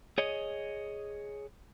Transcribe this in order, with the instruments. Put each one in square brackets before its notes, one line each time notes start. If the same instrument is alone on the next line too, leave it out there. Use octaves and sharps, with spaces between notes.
[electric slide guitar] G#4 C#5 D#5